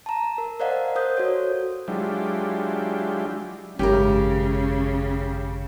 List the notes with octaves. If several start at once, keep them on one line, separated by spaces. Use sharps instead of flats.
A5 A#5
A#4
A#4 C5 D5 D#5 F5 F#5
A#4 C5 D#6 G6
F#4 A4 C#5
F#3 G#3 D4 E4 F4 G4
G#1 F#2 C#3 C#4 E4 G4 A#4